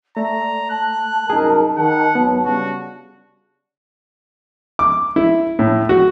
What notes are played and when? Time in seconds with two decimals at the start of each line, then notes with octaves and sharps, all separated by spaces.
0.17 A3 D5 A#5
0.70 A5 F#6
1.30 C2 F#2 D#4 G#4 A#4
1.78 D#3 F#5
2.15 G#1 F#3 B3
2.45 C#3 G3 D4 F#4
4.79 D6
5.16 E4
5.59 A2
5.89 F#4